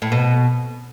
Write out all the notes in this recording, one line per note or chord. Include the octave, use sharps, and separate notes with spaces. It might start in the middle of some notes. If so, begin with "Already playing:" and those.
A2
B2